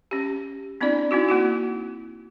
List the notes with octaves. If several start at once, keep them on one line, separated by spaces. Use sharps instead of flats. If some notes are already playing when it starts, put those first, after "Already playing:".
C#4 G4
B3 C4 D4 E4 D5
C4 D#4 E4 F#4
A#3 E4 F#4